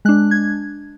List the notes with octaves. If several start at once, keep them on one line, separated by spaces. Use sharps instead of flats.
G#3 D4 F#6
G#6